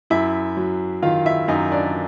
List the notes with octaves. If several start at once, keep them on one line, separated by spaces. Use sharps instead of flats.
F#2 E4 E5
F#3
D#3 F4 F5
E4 E5
F#2 D#4 D#5
D4 D5